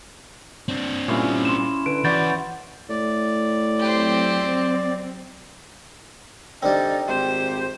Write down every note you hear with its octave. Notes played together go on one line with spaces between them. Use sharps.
C4 D4
A#2 G3 C#4 E4
C6 E7
D3 B4 D7
E2 F#4 D5 B5 G6 A6
A2 D5
F#3 C4 G4 C5
D3 G3 C4 D#4 D5
G#1 G4 C5